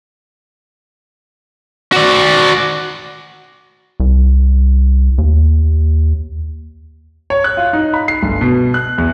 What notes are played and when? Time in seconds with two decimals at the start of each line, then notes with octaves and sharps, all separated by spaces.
1.92 F#4 D5
4.00 C2
5.18 D#2
7.30 C#5
7.44 F#6
7.57 F4
7.73 D#4
7.94 B5
8.08 C7
8.23 G1
8.41 B2
8.74 F#6
8.98 E2